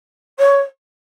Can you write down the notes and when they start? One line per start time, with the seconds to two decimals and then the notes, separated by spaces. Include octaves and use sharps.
0.39 C#5